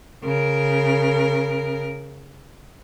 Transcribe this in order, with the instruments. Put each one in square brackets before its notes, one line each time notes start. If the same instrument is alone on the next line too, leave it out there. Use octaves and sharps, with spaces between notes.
[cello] C#3 A#4